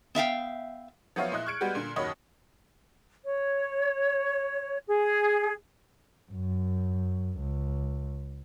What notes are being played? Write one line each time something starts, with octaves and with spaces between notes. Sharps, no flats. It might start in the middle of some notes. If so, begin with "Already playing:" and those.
B3 E5 F5 G5
F3 F#3 B3 C#5 E5 F5
A#2 E4 D#5 F#6
C#6 F6 F#6 G#6 C#7 D7
G3 G#3 B3 F#4 G4
A#2 D3
F#1 D#2 F#4 C#5 D#5 B5
C#5
G#4
F#2
C#2